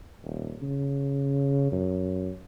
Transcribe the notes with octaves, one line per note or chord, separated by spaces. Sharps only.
D#1
C#3
F#2